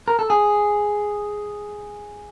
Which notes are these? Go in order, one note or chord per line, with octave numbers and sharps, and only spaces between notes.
A#4
A4
G#4